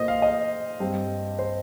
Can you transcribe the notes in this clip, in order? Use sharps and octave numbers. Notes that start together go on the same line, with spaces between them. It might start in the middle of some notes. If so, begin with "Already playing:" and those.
Already playing: A#2 A#3 C5 D#5
F5
D#5
G2 G3 C4
C5